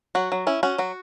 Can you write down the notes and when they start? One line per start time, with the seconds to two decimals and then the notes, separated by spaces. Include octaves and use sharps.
0.15 F#3 F#4
0.32 F#3
0.47 C#4 E4
0.63 C#4 F#4
0.78 F#3 F#4